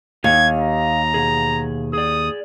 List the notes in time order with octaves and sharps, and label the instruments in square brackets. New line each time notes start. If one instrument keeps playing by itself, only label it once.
[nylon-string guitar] D#2 [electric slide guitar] G4 D#5 F5 [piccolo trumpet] G#6
[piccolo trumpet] A#5
[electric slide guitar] B2 G#4
[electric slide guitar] G#4 D5 [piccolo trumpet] D#6